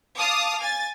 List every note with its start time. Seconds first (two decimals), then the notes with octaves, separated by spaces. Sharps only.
0.18 F5 A5 D6 D#6
0.61 G#5 A6